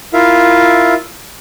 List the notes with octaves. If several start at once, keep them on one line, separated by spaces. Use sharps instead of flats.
E4 F4 A#4 E5 F5